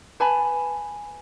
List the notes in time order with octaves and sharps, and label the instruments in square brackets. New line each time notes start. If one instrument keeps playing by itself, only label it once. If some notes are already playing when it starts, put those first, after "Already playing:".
[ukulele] B4 G#5 A5 B5